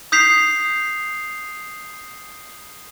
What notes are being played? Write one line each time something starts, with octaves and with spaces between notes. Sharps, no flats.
D#6 G6 B6 C7 F7